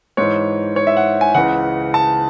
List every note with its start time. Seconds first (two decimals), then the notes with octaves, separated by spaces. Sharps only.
0.17 G#2 E3 C#5
0.76 C#5
0.87 E5
0.97 F#5
1.21 G#5
1.35 C#2 C#3 E3 F#5
1.94 A5